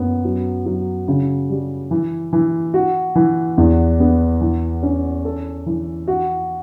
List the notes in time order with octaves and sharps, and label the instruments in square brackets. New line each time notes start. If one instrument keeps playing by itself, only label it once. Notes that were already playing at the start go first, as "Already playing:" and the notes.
Already playing: [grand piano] F#2 B3
F#3
F#3
C#3
G3
E3
E3
F#4
E3
E2
B3
E3
C#4
A4
E3
F#4